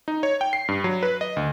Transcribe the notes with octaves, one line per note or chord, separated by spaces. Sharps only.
D#4
C#5
G5
C7
G2
F#3
B4
D#5
D2